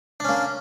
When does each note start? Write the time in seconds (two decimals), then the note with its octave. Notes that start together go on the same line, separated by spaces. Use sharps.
0.20 D4
0.24 C#4
0.29 A#3